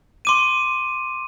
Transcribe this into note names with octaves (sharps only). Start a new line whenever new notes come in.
C6 D6 D#7